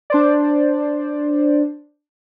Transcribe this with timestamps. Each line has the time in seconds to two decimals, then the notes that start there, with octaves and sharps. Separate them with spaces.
0.10 D4 C5 D5